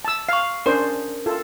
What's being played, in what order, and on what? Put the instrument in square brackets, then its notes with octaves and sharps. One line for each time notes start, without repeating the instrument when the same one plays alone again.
[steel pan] A5 E6
[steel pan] F5 [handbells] C#6 C7
[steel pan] C#4 D4 C5 [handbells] A#4
[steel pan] F4 A4